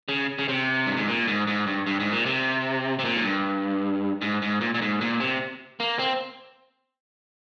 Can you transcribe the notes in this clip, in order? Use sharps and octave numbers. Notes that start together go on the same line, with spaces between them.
C#3
C#3
C3
G2
G#2
A#2
G#2
G#2
G2
G2
G#2
A#2
C3
C3
A#2
G#2
G2
G#2
G#2
A#2
A#2
G#2
A#2
C3
A#3
C4